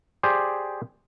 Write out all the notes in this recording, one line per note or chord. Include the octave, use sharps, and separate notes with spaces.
G4 G#4 C5 D5